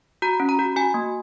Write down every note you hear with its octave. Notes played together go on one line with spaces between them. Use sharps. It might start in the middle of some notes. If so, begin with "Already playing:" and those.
F#4 A#5
C#4
A#5
F#4
F#4 G#5
A#3